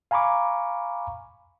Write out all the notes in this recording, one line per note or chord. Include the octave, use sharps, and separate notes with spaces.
F5 G#5 A#5 B5 C#6 D6